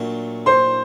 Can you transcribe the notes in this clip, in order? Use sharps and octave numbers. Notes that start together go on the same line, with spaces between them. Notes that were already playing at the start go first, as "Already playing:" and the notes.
Already playing: A#2 F#3 A3 D4
C5 C6